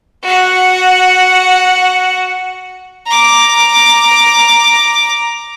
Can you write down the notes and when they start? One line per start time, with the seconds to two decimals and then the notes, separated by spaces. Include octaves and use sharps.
0.23 F#4 F#5
3.06 A#5 D6